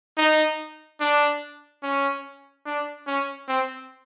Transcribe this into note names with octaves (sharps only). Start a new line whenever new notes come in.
D#4
D4
C#4
D4
C#4
C4